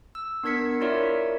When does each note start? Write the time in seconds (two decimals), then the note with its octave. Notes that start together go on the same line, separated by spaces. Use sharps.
0.15 E6
0.43 B3 D4 A#4 G#6 B6 C#7
0.80 E4 F4 A#4 C#5 D5 E5